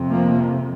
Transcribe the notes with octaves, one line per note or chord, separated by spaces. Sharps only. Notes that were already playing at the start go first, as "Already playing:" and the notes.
Already playing: F2 C3
F3 A#3